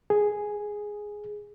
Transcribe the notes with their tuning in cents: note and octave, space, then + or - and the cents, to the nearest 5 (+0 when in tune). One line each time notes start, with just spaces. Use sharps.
G#4 +0